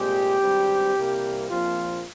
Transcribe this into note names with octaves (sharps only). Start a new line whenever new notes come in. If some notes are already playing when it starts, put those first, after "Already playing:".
Already playing: C2 A#2 G#3 C4 G4
G#1 G2 G3 C4
C2 C3 G3 A#3
A#1 A#2 F3 C4 F4